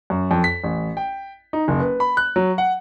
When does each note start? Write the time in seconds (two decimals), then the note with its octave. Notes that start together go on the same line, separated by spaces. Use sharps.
0.10 F#2
0.31 F2
0.44 B6
0.64 A1
0.97 G5
1.53 D#4
1.68 F#1
1.80 B4
2.00 B5
2.17 F#6
2.36 F#3
2.58 F#5